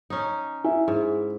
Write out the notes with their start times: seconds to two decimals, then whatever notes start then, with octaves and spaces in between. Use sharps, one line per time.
0.10 C#4 D#4
0.64 E4 E5 G#5
0.88 G#2 G#4